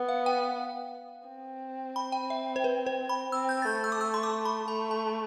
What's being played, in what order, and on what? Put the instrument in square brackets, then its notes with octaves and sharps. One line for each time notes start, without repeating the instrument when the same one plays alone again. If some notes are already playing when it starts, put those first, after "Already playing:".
Already playing: [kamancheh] B3
[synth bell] F5
G5
[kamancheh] C4
[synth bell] B5
G5
E5
C5
B4
C5
B5
[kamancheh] C4 [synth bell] E6
[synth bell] G6
A6
[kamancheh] A3 [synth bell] G6
[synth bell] E6
D6
E6
C6
D6
B5
[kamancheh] A3 [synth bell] A5
[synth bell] A5